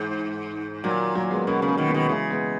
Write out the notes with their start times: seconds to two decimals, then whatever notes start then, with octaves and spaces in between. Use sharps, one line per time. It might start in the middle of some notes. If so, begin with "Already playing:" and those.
Already playing: G#2 E3
0.84 A#2 D#3 F#3
1.15 F#3 A#3
1.31 G#3 B3
1.47 B2 A#3 C#4
1.62 C#3
1.68 A#3 C#4
1.77 B2 D#3
1.88 G#3 B3
1.94 B2 D#3
2.09 C#3 E3 G#3
2.30 G#3 B3